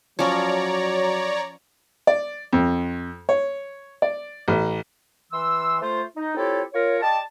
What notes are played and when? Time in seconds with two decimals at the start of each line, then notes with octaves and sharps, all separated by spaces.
0.19 F3 F#3 C#4 C#5 D5 A#5
2.07 D5
2.53 F2
3.29 C#5
4.02 D5
4.48 A1
5.32 E3 C6 E6
5.81 A3 F4 C5
6.16 D#4
6.36 C4 E4 F4 G4 A4 C#5
6.73 F4 A#4 C#5
7.02 G4 D5 D#5 A5